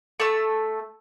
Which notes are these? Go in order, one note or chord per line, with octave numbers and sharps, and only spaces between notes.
A3 E6